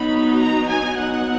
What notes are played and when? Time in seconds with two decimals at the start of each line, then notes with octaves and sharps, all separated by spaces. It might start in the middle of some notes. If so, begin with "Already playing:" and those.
Already playing: F#3 B3 D#4 B5
0.39 A#5
0.68 G#5
0.97 F#3 B3 D#4 F#5